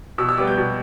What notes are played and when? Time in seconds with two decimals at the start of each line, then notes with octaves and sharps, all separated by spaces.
0.18 B2 E6
0.29 E6
0.38 G3 B3 D6
0.47 G6
0.57 B2